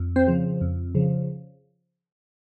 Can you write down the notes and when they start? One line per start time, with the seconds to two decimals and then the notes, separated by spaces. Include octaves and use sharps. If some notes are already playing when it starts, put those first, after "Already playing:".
Already playing: F2
0.16 C4 C5
0.27 C#3 F3
0.61 F2
0.95 C#3 F3